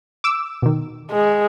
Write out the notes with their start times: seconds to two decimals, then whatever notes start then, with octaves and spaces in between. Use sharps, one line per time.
0.24 D6 E6
0.62 B2 D#3
1.11 G#3